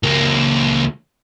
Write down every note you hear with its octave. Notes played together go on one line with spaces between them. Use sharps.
C#2 A#3